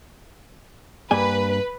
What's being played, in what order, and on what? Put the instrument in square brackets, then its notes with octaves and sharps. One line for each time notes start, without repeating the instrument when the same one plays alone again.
[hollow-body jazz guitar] G2 A#3 G#5 [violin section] B4